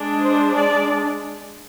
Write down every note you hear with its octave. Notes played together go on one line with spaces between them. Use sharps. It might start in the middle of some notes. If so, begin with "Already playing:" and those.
Already playing: G#3 D4
C5
D5